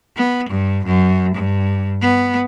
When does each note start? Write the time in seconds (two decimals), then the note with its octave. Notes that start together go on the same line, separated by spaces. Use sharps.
0.16 B3
0.49 G2
0.85 F#2
1.35 G2
2.01 B3